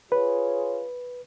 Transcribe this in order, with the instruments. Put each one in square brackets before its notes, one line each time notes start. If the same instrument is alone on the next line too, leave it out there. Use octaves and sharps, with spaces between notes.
[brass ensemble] F4 G#4 C#5 [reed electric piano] B4